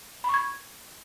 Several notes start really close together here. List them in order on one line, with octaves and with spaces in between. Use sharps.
B5 C#6 G#6